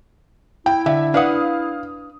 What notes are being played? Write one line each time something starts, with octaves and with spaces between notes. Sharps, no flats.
E4 G5
D3 E5
D4 B4 F5 F#5 D#6